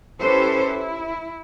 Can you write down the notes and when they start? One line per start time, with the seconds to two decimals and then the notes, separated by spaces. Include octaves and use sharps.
0.21 C#4 E4 G4 A4 B4 C5
0.66 E4